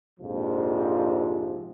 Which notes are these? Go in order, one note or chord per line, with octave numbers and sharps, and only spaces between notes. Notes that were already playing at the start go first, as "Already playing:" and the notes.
A#1 F2 G#2 C3 F3